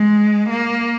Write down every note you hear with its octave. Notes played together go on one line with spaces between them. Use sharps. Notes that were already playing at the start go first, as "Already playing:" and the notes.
Already playing: G#3
A#3